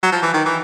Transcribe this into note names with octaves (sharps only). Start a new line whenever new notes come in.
F#3
F3
E3
D#3
E3